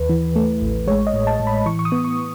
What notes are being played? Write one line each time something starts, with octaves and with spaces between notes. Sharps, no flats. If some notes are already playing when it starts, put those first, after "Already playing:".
Already playing: D#2 B4
E3
A3
A1
G#3 C#5
D#5
A2
A5
A2
B5
E3 C#6
C#6
D#6
B3
C#6